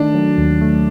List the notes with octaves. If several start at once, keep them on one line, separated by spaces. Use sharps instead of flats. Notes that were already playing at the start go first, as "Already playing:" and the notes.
Already playing: D#3 A3 D4
F#3
D#2
A3